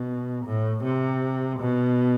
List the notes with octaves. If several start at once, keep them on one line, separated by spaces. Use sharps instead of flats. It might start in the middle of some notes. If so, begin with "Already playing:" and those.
Already playing: B2
A2
C3
B2